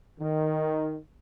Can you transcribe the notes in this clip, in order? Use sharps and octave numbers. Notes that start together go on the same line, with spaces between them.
D#3